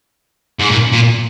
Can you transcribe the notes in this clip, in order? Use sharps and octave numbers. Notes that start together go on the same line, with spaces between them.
G#2
A#2
A#2